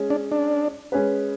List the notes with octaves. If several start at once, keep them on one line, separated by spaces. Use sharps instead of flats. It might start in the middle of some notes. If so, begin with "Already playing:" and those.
Already playing: G#3 C#4 G#4
D4
D4
G#3 C#4 G#4 B4